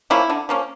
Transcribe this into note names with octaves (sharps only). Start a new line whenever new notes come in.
F3 A#3 C#4 E4
D3
F3 A#3 C#4